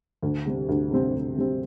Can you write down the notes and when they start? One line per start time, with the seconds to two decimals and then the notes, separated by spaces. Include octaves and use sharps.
0.23 D2
0.46 C3 G3 C4
0.69 D2
0.91 C3 G3 C4
1.14 D2
1.36 C3 G3 C4